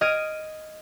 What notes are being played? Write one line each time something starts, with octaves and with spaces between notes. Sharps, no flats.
D#5 F6 G#6 D7 D#7